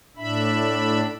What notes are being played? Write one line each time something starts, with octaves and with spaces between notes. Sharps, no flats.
A2 D4 E5 B5